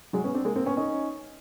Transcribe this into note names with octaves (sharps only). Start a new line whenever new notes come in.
F#3 G#3
B3 C#4
C4 D4
G#3 A#3
A#3 C4
B3 C#4
C#4 D#4